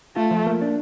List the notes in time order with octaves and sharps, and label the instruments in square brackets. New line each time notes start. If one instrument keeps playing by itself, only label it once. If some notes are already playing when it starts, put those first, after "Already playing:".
[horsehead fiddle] A3 [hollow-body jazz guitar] F4
[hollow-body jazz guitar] F3
A#3
D4